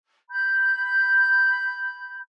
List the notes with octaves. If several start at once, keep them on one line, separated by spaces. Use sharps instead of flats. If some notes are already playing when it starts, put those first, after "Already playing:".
B5 G6